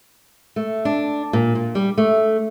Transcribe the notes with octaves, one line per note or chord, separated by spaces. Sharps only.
A3
D4
A#2
A#2
G3
A3